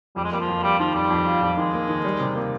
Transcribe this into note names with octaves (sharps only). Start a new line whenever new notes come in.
F2 G3
G#3
G3 A#3
F3
F2
G3 F4
D#3 F3
F2 G3
F2
F4
F2
D#3 G#3
A#3
D#3
G3
C3
A#3